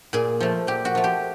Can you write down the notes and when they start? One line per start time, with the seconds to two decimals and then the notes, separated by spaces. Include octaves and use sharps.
0.13 A#2 G#4
0.40 F3 A3
0.67 A#2 G4
0.85 F#4
0.95 F3 A3
1.04 G4